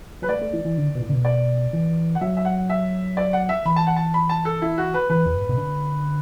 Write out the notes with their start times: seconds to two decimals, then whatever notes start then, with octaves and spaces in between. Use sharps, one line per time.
0.22 F#3 B4
0.29 A3 D5
0.41 A3
0.53 E3
0.65 E3
0.78 D3
0.95 B2
1.01 A2
1.09 D3
1.13 B2
1.25 D5
1.73 E3
2.15 F#5
2.21 F#3 E5
2.37 E5
2.45 F#5
2.70 E5
3.17 D5
3.33 F#5
3.49 E5
3.65 E3 B5
3.76 A5
3.87 F#5
3.96 A5
4.14 B5
4.29 A5
4.45 A4
4.62 E4
4.78 F#4
4.94 B4
5.10 E3 B4
5.26 E2
5.34 F#2
5.41 A2
5.49 B2
5.57 D3